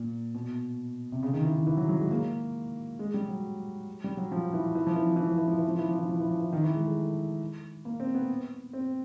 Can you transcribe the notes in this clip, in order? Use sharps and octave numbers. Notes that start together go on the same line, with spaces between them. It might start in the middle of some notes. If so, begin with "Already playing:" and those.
Already playing: A#2
B2
C3
C#3
D#3
E3
D#3
E3
F#3
F#3
G#3
A#3
G#3
G3
F#3
G3
F#3
F3
E3
E3
F3
E3
F3
E3
F3
E3
F3
E3
F3
E3
F3
E3
F3
E3
F3
E3
D#3
E3
G#3
A3
A#3
C4
B3
C4